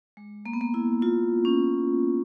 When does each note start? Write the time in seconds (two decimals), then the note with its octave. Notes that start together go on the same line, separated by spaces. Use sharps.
0.17 G#3
0.46 A#3
0.53 B3
0.61 A#3
0.74 E4
1.02 F4
1.45 C#4